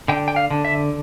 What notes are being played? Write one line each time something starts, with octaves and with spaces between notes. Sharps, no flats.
D3 G5
G5
F5
D3
E5